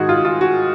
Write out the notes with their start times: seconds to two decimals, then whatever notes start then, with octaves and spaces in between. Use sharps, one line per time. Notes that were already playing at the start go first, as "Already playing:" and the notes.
Already playing: G#2 D#3 F#4 G#4
0.09 F4
0.25 F4
0.41 F#4